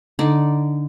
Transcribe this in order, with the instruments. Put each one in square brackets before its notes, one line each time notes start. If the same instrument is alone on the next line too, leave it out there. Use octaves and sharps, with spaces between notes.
[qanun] D3 D#4 D5